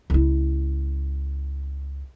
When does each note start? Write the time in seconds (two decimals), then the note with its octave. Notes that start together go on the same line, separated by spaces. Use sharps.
0.10 C#2 E4